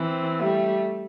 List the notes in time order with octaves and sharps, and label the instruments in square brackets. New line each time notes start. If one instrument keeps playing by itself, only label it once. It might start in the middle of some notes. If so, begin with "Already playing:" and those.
Already playing: [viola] E3 [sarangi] C4
[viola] G3 [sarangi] A3